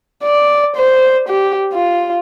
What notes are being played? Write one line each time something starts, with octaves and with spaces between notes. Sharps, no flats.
D5
C5
G4
F4